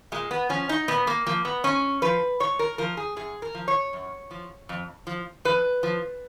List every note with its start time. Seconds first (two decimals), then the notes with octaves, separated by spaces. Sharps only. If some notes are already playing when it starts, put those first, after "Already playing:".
0.12 A#2 G#3
0.31 B3
0.49 F3 C#4
0.69 D#4
0.88 A#2 B3
1.07 A#3
1.26 F3 A#3
1.45 B3
1.64 G#2 C#4
2.02 F3 B4
2.40 G#2 C#5
2.59 A#4
2.78 F3 A#4
2.97 G#4
3.16 F#2 G#4
3.42 A#4
3.54 F3
3.68 C#5
3.93 F#2
4.31 F3
4.69 F2
5.07 F3
5.45 F2 B4
5.83 F3